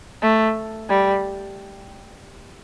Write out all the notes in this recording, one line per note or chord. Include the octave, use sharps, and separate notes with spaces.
A3
G3